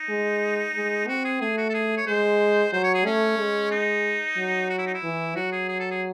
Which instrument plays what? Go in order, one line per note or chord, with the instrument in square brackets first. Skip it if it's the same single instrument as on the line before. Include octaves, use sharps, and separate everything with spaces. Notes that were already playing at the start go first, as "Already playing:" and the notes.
Already playing: [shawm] D#4
[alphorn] G#3
G#3
[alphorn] C4 [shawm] F#4
[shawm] G#4
[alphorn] A3 [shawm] G#4
[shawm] F#4
A4
G#4
C#5
[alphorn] G#3 [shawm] C5
[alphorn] F#3 [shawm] C5
[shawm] C#5
G#4
[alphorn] A3 [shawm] C#4
[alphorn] G#3
[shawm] D#4
[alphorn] F#3
[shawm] F#4
E4
D#4
E4
[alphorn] E3
[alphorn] F#3 [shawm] F#4
[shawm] G#4
G#4
A4
G#4